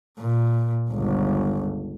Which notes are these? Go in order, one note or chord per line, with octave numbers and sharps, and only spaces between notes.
A#2
G1 C#2